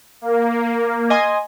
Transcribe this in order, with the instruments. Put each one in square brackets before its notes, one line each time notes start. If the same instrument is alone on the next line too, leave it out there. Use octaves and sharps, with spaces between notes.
[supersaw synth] A#3
[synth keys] D#5 G#5 C6